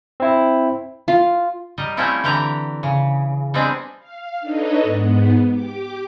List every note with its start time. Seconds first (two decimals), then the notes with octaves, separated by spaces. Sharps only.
0.20 C4 E4
1.08 F4
1.78 G3 A#4 D#5
1.97 G3 A3 C4 C#4 E4 F4
2.24 D3 E3 G4 F#5 A#5
2.83 C#3
3.54 G3 G#3 B3 C4 D4 G#4
3.99 F5
4.40 D4 D#4 A4 B4 C#5 D#5
4.82 G#2 B3
5.49 G4 D6